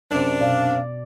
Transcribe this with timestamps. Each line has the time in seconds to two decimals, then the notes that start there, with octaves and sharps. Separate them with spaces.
0.11 F#2 C3 D4
0.41 B2 D5 F5